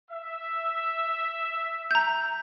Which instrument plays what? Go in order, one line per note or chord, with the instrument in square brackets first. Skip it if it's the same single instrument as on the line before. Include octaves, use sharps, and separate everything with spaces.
[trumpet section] E5
[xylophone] A#5 G6